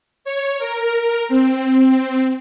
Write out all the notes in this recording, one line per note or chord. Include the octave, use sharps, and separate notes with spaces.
C#5
A#4
C4